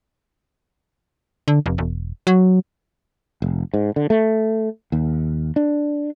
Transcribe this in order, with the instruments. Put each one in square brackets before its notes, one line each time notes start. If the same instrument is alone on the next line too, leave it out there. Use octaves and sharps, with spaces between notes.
[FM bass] D3
F1
E1
F#3
[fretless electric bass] F1
G#2
D3
A3
D#2
D4